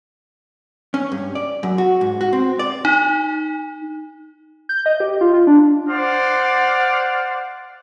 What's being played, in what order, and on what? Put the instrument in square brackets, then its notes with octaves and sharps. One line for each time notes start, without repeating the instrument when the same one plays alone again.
[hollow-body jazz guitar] C#4
G2
D5
F#2
F#4
G#2
F#4
C4
D5
[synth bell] D#4
[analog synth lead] G6
D#5
G4
F4
F4
D4
[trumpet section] C5 D5 F5 F#5